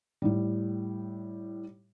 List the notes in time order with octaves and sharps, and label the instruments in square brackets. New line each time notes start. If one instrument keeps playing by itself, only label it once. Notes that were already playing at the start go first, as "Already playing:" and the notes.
[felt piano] A2 G3